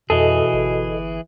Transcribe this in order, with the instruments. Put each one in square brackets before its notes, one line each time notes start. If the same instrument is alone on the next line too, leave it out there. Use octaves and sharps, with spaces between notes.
[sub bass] F2 [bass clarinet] B2 [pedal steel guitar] E3 G#4 [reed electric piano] A4 D#5
[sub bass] G1